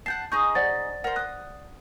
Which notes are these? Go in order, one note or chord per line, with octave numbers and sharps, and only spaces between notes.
F#5 G5 A5 G6 C7
D#4 G#4 D#5 C#6 G6
C5 D5 F#5 A6
A#4 C5 F#5
D#6 F#6 G6